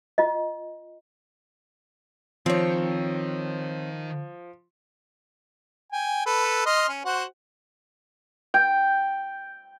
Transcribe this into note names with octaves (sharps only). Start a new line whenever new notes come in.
F4 D#5
D#3 F3 C4 C#5
G5 G#5
A4 B4
D#5 C6 F6
C#4
F#4 C5 F#5
G5